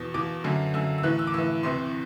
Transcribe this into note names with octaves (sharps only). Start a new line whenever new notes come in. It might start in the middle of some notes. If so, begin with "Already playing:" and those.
Already playing: E2 B2
E2 B2 D6
F#2 D3
F#2 D3 E6
E6
A2 E3 F#6
E6
D6
A2 E3 E6
E2 C3 E3 C6